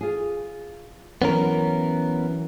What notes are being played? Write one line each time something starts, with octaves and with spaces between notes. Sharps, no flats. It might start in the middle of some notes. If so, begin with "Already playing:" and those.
F4 G#4
E3 F#3 B3 C#4 A#4